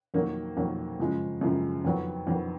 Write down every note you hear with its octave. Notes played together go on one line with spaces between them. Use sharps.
F2 D#3 F#3 A#3
F2 D#3 F#3 A#3
F#2 C#3 F3 G#3
F#2 C#3 F3 G#3
F2 D#3 F#3 B3
F2 D#3 F#3 B3